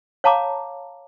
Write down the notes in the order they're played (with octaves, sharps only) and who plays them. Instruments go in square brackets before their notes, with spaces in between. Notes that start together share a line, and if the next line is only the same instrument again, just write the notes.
[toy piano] C#5 F5 A5 A#5 D6